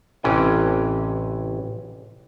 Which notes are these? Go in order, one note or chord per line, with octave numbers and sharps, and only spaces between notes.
A1 C3 E3 C#4 G5 G#5